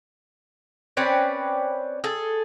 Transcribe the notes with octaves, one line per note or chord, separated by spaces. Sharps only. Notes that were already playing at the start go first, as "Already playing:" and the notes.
C4 C#4 B4 D5
G#4 A4